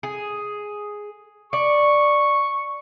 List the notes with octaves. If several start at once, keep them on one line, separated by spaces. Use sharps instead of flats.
G#4
D5 C#6